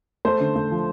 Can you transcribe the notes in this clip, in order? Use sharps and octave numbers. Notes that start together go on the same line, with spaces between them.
A3 C5
D3
A3
F3